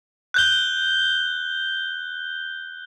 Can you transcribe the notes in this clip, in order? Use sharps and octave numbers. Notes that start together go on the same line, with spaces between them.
F#6 G6 G7